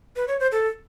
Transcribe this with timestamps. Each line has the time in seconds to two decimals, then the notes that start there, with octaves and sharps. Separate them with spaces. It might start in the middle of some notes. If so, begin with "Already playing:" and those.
0.16 B4
0.28 C#5
0.40 C5
0.52 A4